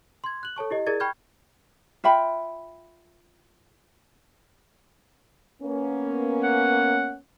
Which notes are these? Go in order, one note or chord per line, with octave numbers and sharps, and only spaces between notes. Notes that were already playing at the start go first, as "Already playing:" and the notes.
C6 G#6
F#6 F#7
A4 C#5 A5 C#6
E4 G4 D#5
E4 G#4 A#4 D5 G#6 A6
G5 B5 C#6 F6 G6 G#6
F4 E5 G5 B5
A#3 B3 C#4
F#5